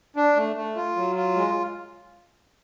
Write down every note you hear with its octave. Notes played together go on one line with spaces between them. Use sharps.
D4
A3
A3
F4
F#3
F4
G#3